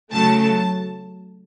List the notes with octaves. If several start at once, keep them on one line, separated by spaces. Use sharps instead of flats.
C#3 F#3 A3 A5
A5